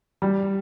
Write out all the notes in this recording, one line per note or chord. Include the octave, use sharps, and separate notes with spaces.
G3